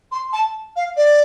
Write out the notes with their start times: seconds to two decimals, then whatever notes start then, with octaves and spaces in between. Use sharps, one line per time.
0.12 C6
0.33 A5
0.76 F5
0.97 D5